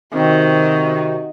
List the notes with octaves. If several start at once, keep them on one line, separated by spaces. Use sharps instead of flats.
C3 D#3 C4 F#4